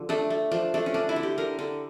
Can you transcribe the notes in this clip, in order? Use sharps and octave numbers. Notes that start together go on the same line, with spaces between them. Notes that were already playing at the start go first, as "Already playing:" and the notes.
Already playing: D3 F3
A3 D4
A3
F3 D4
A3 D4
C#4
D3 D4
E4
D3
G4
D3 A#4
D3